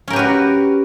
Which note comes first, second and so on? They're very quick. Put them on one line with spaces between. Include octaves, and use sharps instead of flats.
C#4 A#4 G4 B4 F#4